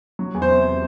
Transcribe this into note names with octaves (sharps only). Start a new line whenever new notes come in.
F#3
E2
C5
C3